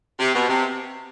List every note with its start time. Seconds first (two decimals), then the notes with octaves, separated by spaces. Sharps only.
0.19 C3
0.34 B2
0.49 C3